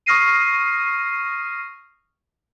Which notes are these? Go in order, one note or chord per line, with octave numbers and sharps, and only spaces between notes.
C#6 D#6 F6 A#6 C7 D#7